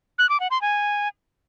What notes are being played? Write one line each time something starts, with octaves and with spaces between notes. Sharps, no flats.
F#6
D6
F#5
C6
G#5